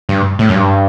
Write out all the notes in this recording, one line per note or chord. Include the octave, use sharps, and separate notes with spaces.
G2
A2
F#2
G2